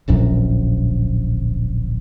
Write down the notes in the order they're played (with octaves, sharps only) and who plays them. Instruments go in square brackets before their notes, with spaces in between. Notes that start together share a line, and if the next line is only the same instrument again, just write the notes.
[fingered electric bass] D1 A#1 F#2